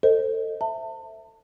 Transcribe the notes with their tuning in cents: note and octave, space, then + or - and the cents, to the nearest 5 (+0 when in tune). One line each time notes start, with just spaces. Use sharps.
A4 +25 C5 +0 D#5 +0
E5 +0 A5 +40